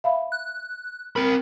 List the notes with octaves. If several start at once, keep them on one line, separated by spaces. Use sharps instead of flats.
E5 F5 B5
F#6
C4 A#4 B5